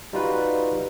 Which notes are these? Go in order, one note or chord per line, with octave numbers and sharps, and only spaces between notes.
G3 D#4 F4 F#4 B4